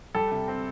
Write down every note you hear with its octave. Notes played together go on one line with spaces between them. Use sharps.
G3 A4
C3
C4